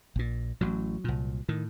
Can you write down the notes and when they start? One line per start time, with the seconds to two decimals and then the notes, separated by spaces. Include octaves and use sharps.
0.16 A#1 A#2
0.61 A1 A2 F#3
1.04 C2 A#2
1.49 A2 D#3